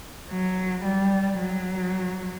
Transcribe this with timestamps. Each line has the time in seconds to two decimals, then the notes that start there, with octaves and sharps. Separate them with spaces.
0.30 F#3
0.85 G3
1.40 F#3